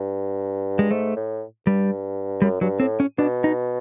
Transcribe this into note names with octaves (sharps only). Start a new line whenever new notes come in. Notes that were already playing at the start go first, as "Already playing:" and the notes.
Already playing: G2
G#3
G#2 A3
A2
G2 G3
F#2 G3
G2 F#3
A2 C4
C#4
B2 D4
D#4